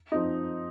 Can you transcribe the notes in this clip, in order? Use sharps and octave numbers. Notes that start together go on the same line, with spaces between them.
F3 C4 D#4